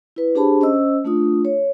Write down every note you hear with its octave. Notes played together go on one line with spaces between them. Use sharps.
E4 B4
D4 G4 G#4 C5 A5 B5
C#4 C5 D#5 E6
A3 D4 F4 D#6
C#5